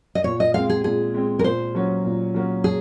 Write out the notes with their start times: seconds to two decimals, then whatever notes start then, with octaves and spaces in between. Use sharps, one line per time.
0.15 D#5
0.24 A#2 C#5
0.40 D#5
0.54 G#3 C4 F5
0.69 G#4
0.84 A#2 G#4
1.14 G#3 C4
1.39 A#4
1.44 A#2 C5
1.75 F#3 A#3 C#4
2.04 A#2
2.34 F#3 A#3 C#4
2.64 G#4